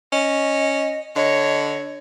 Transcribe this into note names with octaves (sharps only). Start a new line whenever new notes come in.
C#4 D#5
D3 C#5 D#5